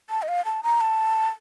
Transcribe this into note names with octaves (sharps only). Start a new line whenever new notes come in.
A5
D#5
F5
A5
A#5
A5